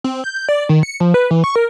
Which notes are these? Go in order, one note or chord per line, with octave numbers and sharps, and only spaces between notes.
C4
G6
D5
D#3
C#7
F3
B4
E3
C#6
A#4